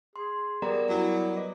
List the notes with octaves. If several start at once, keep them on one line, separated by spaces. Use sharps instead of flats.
G#4 C6
G3 B3 A#4 D5 A#5
F#3 E4
B4 D#5 D6